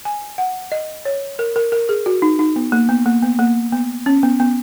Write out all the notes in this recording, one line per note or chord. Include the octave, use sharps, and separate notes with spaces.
G#5
F#5
D#5
C#5
A#4
A#4
A#4
G#4
F#4
D#4
D#4
B3
A#3
B3
A#3
B3
A#3
B3
C#4
B3
B3